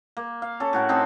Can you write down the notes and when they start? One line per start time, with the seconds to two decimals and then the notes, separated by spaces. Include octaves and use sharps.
0.17 A#3
0.42 F5
0.60 C#4 A4
0.73 A2 F#4 A#4
0.89 C4 D#4 G4 A4